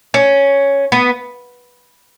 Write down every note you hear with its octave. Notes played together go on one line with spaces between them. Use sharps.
C#4
B3